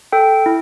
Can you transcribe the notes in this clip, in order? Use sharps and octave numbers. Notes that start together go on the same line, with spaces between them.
A4 G5
E4